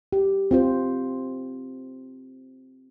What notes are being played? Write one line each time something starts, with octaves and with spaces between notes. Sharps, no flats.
G4
C4 F4 C5